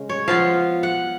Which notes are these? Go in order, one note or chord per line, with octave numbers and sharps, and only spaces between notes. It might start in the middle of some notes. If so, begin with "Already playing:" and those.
Already playing: C#3 G#3
C#5
F3 B3 F4 F5
F#5